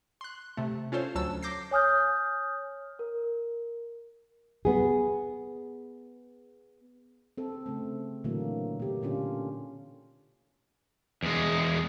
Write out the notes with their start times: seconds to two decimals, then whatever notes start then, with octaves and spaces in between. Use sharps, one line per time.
0.21 C6 F#6
0.57 C3 A3
0.92 C#4 F4 A4 C5 C#5
1.15 D2 F#3 A5 E6
1.43 D6 G6 A#6 C7
1.71 C#5 G#5 D#6 F6 G6
2.99 A#4
4.65 B3 G#4
7.38 C4 A4
7.66 C#3 A3 C4
8.24 A#2 D3 E3 F#3 A3 A#3
8.80 B2 G4
9.02 A#2 D3 C#4 D4 F4
11.23 E2 G#3